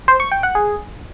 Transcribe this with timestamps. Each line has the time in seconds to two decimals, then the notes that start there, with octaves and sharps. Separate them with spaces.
0.08 C5
0.20 C#6
0.31 G5
0.43 F#5
0.55 G#4